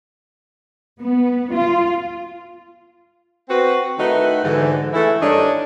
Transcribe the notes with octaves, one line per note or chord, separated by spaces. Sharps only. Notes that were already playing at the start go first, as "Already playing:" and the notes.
B3
F4
C4 F#4 B4
D#3 A3 D#4 E4 F#4 B4
G#2 D3 E3
E3 G#3 A3 E4
G2 D#3 D4 A4 C#5 D#5